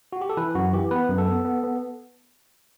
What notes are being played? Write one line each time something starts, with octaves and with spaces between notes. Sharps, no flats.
F#4
G4
A4
E3 B4
F#2 F#4
E3 G4
B3 B4
F#2
A4
B3
B3
B3